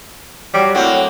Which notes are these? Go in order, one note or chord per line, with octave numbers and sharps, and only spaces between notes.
F#3 G3
A2 F#3 A#3 C4